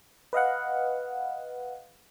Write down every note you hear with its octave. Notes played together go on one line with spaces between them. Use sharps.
B4 D#5 F5 F#5